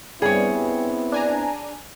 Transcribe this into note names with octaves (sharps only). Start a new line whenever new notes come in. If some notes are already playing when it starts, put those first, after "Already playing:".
G2 G3 B3 C4 E4 G#4 C#5
D4 G#5 A#5